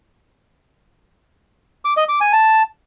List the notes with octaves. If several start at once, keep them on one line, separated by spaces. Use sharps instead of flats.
D6
D#5
D6
G#5
A5